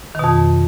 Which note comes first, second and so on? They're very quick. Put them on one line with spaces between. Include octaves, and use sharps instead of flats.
D#3 B2 F2